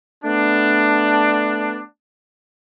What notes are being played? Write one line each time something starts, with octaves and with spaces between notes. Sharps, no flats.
A3 B3 D4